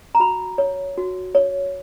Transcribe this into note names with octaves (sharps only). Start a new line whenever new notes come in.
A#5
F#4 B5
C#5
F#4
C#5